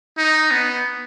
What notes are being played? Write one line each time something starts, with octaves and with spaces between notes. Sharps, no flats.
D#4
B3